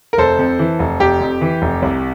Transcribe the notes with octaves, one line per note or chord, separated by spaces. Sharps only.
A#4
F1 A4 C5
F2
E3
F1
F1 G4
F2
E3
F1
C2